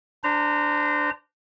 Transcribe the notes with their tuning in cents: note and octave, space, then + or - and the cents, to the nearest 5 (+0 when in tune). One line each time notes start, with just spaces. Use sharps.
D4 +0 C5 -30 A#5 -25